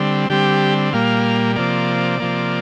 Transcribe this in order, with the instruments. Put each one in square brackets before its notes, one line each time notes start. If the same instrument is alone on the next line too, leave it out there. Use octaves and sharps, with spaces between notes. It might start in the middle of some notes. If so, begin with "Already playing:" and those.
Already playing: [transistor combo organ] D3 G3 C4
D3 G3 C4 G4
A#2 G3 A#3 F5
C3 F3 A#3 D5
C3 F3 A#3